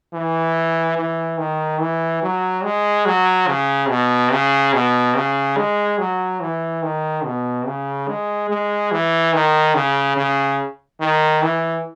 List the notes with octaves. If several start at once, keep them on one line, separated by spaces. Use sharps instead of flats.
E3
E3
D#3
E3
F#3
G#3
F#3
C#3
B2
C#3
B2
C#3
G#3
F#3
E3
D#3
B2
C#3
G#3
G#3
E3
D#3
C#3
C#3
D#3
E3